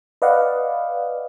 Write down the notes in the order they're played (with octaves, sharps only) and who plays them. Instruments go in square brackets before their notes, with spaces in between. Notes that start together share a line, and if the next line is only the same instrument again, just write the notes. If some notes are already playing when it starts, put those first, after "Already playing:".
[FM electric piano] B4 D5 D#5 F5 F#5